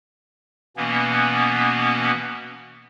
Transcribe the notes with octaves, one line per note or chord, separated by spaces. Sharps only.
B2 E3 A#3 B3 C#4